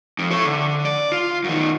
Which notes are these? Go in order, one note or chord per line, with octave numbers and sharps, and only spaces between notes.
F2
A4 C#5
D3
D5
F4
F#2 D#3